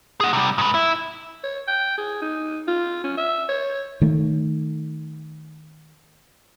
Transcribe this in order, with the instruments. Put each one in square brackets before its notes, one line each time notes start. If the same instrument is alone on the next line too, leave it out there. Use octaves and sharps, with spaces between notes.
[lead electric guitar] G#4 F#5
C3 G3
G#2 B4
E4
[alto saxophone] C#5
G5
G#4
D#4
F4
C#4
E5
C#5
[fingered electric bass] D#3 A3